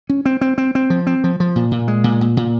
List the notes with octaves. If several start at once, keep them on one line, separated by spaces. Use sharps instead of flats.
C#4
C4
C4
C4
C4
F3
C4
F3
F3
A#2
A#2
G#3
A#2
A#2
A#2